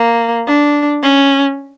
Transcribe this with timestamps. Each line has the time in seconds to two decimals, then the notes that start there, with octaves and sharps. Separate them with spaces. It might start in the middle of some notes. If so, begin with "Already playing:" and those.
Already playing: A#3
0.47 D4
1.03 C#4